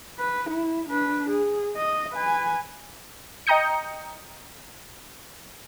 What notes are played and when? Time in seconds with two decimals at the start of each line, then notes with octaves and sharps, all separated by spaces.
0.19 B4
0.49 E4
0.88 D4 B4
1.29 G#4
1.76 D#5
2.13 B4 G#5
3.47 D#5 G5 A#5 D#6 G6 C#7